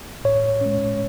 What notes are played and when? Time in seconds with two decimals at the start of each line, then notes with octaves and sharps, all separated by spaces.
0.24 A2 C#5
0.61 G#3 C#4